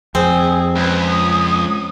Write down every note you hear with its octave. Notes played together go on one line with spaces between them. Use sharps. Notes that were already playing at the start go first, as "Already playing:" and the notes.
F2 C4 G#4
C#2 B4
D#6